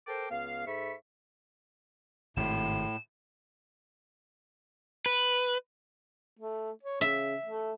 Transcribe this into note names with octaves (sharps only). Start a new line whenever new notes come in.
A4 A#4 C5 G5 D6
C#2 B3 F5
G#2 A4 E5 B5 C#6
G#1 A2 C3 E7
B4
A3
C#5
C#3 E5
A3